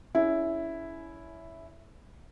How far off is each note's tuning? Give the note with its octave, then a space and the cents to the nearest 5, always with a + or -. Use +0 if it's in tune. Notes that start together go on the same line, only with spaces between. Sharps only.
C#4 +30 E4 +0 G#4 +25